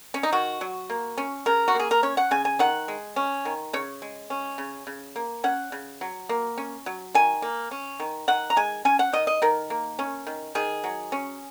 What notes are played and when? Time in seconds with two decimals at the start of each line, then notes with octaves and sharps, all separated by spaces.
0.14 C#4
0.23 D#4
0.32 D#3 F#4
0.61 F#3
0.90 A#3
1.18 C#4
1.46 C#3 A#4
1.68 F#4
1.75 A#3 G#4
1.91 A#4
2.03 C#4 C#5
2.17 F#5
2.31 C#3 G#5
2.45 G#5
2.59 D#3 F#5
2.88 G#3
3.16 C#4
3.45 D#3
3.73 C#3 C#5
4.02 G#3
4.30 C#4
4.58 C#3
4.87 C#3
5.16 A#3
5.44 C#4 F#5
5.72 C#3
6.01 F#3
6.29 A#3
6.58 C#4
6.86 F#3
7.15 D#3 G#5
7.42 A#3
7.71 C#4
8.00 D#3
8.28 D#3 F#5
8.50 A#5
8.56 G#3 G#5
8.85 C#4 G#5
8.99 F#5
9.13 D#3 D#5
9.27 D#5
9.42 D#3 A#4
9.70 A#3
9.99 C#4
10.27 D#3
10.55 D#3 G#4
10.84 F#3
11.12 C#4